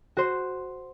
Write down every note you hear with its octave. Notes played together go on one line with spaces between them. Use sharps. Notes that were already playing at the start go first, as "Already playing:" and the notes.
F#4 C5